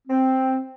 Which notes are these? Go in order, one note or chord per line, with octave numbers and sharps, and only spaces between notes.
C4